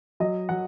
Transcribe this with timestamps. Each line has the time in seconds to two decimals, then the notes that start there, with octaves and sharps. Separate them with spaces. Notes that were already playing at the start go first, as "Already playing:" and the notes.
0.20 F#3 D#5
0.49 F#3 F#5